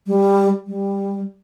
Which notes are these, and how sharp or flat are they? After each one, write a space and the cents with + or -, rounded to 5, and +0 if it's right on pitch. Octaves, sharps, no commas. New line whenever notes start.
G3 +10
G3 +15